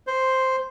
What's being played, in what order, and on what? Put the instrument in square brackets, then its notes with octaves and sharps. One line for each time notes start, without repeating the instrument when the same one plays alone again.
[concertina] C5